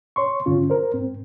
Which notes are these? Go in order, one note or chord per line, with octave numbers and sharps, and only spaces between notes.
C#5 C6 C#6
G2 D3 C#4 F4
A#4 C5
G#2 C4